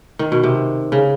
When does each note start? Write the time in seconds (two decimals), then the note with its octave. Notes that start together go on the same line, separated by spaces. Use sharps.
0.19 D#3
0.32 B2
0.43 C3
0.92 C#3